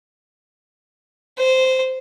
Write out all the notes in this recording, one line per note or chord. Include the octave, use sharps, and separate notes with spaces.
C5